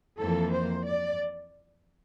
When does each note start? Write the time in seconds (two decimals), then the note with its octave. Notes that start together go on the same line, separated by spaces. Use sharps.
0.19 F2 E3 A#3 A4
0.52 C5
0.85 D5